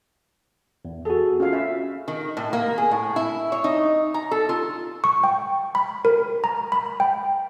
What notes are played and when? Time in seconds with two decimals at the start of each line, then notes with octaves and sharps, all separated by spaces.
0.85 E2
1.05 F#4 G#4 A4
1.40 C#4 F4 F5
1.53 E5
2.08 D#3
2.37 A2
2.53 A#3
2.78 G#4
2.91 A2
3.16 E4
3.52 C#5
3.64 D#4
4.14 A#5
4.31 A4
4.49 F4
5.04 C#6
5.24 G5
5.75 B5
6.05 A#4
6.44 A#5
6.72 B5
7.00 G5